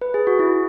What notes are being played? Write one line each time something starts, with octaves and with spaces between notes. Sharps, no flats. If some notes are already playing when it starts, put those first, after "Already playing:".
B4
G#4
F#4
E4